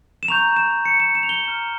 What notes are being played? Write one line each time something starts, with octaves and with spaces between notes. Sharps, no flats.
E7
A#5 C#6 G6 F7
E7
C#7
E7
E7
F7
G7
A#5 F6